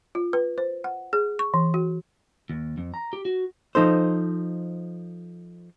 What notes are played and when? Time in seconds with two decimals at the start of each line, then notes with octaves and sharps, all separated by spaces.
0.15 F4
0.33 B4
0.58 C5
0.84 F#5
1.13 G#4
1.39 C#6
1.54 E3
1.74 F#4
2.50 D#2
2.78 F2
2.94 A#5
3.13 G4
3.25 F#4
3.75 F3 D#4 A4 C5